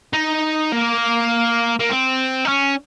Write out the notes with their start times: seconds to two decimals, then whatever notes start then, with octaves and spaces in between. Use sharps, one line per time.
0.13 D#4
0.73 A#3
1.79 A#3
1.89 C4
2.45 D#4
2.48 C#4